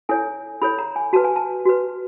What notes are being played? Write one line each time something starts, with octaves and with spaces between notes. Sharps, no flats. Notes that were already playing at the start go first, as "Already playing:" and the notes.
E4 A4 C#5 G#5
E4 A4 C#5 B5
A#5
G#5
F#4 B4 A5
G#5
A5
F#4 B4